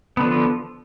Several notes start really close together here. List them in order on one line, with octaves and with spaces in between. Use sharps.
B3 D3 F3